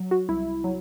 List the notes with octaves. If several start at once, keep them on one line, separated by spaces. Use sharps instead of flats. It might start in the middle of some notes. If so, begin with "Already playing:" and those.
Already playing: F#3
F#4
C2 E4
F#3